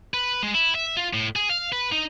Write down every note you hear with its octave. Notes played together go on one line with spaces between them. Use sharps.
B4
G#3
E4
E5
F4
A2
G#4
F5
B4
D#4